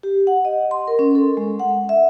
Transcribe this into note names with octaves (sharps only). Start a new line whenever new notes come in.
G4
F#5
D#5
C6
A#4
C#4
A4
G#3
F#5
E5